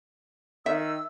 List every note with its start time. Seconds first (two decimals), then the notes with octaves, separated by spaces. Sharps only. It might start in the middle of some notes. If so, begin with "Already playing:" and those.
0.66 D#3 E5 E6